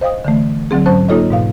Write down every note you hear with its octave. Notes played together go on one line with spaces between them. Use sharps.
C5 D#5 F5 G5 D#6
D3 E3 A3
D3 F#3 C4 G#4
G#2 F#3 C#4 C5 A5 F#6
A#3 D#4 F4 A4 C#5 D#5
G#2 B2 F5